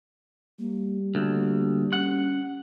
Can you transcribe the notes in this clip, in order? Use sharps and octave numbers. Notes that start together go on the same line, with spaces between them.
G3 A#3
D2 A#3
C#4 F#5